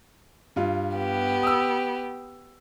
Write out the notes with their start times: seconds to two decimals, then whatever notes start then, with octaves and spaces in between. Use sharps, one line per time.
0.56 G2 F4
0.97 B3 G4
1.43 D#6 E6